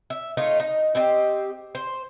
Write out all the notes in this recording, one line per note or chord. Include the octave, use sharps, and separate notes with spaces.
E5
A3 D#4 F4 C#5
D#4
C4 G4 D#5
C5